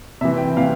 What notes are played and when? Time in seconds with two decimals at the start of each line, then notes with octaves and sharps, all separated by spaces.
0.21 C3 E3 E5
0.38 G5
0.57 C3 E3 F5